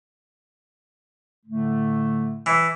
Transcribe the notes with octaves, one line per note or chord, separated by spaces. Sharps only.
A2 D3 A3
E3